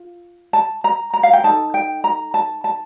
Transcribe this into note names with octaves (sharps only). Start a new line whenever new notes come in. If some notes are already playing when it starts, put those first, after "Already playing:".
Already playing: F4
A5
A#5
A#5
F5
G5
D#4 A4 A5
G5
A#5
A5
A5